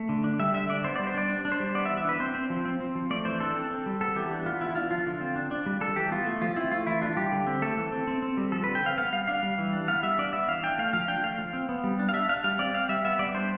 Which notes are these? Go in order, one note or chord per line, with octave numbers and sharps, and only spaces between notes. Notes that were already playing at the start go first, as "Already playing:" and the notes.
Already playing: A3
D3
D4
G3 E5
D3 E5
D4 D5
B3 C5
G3 D5
C5
D4 D5
D4
D4
C5
G3
B3 D5
E5
E3
E5
D4 B4
C4 C5
C4
F3
C4
C4
F3
A3 D5
E3 C5
D4 A4
C4
C4
G3
B3 A4
E3 G4
D4
B3 F4
E3 E4
D4 F4
F3 F4
D3
C4
D4
D4
G3
G3 A4
E3 G4
B3 F4
A3
F3 F4
C4 E4
A3 F4
E3 E4
D4 F4
G3 G4
D3
C4
A3 A4
E3
C4
C4
C4
G3
F3 A4
D3 B4
G5
C4 F5
B3 F5
G3 F5
D4 F5
G3
E3
D4
B3 F5
G3 E5
D4 D5
B3 E5
E3 F5
D4 G5
A3 F5
F3 F5
D4 G5
A3 F5
F3
C4
B3
G3
D4
F5
D4 E5
D4 F5
G3 F5
C4 D5
C4 F5
G3 E5
B3 E5
G3 D5
D4 C5